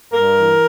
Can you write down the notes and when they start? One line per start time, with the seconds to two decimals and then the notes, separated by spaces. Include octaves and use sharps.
0.12 G2 A#4
0.37 E3